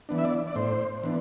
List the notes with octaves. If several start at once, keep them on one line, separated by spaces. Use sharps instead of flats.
E3 B3 D4
E5
D5
D5
A2 C5
E3 B3 D4